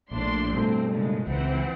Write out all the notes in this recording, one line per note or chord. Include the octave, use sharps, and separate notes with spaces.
A#1 A2 D4 C6
G2 B2 A3 C4
C#3 G#3
C#2 E3 C4 F#5